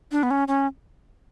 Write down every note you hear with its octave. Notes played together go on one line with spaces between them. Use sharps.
D4
B3
C#4
C#4